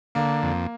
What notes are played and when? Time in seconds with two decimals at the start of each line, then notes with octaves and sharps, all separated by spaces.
0.15 D3 A#3
0.43 F2